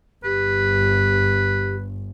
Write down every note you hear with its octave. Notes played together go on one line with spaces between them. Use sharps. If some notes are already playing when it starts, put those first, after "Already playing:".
G1 G4 B4